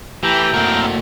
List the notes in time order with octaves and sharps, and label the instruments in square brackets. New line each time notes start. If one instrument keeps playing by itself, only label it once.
[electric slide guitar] A2 A3 [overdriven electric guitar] E3 [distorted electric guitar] G4 [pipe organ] G5 A#5
[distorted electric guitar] A#3 F#4 [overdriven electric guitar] C4 A#4